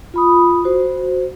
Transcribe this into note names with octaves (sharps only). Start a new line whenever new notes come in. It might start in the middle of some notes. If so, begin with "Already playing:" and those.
F4 B5 D#6
F#4 C5